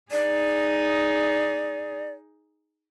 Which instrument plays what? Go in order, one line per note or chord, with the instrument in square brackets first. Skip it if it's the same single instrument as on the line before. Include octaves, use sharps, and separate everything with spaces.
[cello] D#4 G#4 [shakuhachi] D5